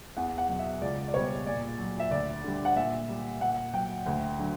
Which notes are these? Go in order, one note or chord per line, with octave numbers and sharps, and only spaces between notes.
E2 F#5
F#5
B2 F#3
E5
C#2 D5
D5
B2 G3 C#5
A#2 D5
F#3
E5
D2 D5
D3 G3
F#5
A#2 E5
G3
A#2 F#5
F#3 G5
D2
D3 F#3